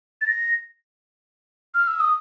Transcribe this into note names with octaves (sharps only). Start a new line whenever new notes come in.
A6
A#6
F6
E6
D#6